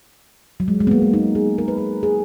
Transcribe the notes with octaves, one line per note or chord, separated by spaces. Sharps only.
F#3
G#3
G#3
B3
A#3
B3
D#4
G#4
A#4
B4
A#4
G#4